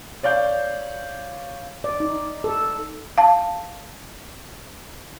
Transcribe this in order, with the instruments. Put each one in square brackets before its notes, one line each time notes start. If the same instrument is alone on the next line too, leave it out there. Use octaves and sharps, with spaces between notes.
[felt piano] C#5 D5 F5 G6
[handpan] D5
D#4
A4
[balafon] F5 A5